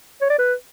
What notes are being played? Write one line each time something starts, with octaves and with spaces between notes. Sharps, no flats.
C#5
D5
B4